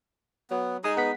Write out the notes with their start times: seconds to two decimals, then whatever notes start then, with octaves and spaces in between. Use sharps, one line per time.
0.51 F#3 B3
0.84 G#3 D#4 G#4 A#5 D#6
0.97 B3 F#5 B6